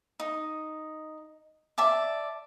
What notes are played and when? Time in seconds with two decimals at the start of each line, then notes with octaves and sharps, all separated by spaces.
0.20 D#4
1.78 D5 E5 A5 D6